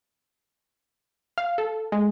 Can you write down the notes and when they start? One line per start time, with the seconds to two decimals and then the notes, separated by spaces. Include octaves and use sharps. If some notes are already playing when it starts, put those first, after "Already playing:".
1.38 F5
1.58 A4
1.92 G#3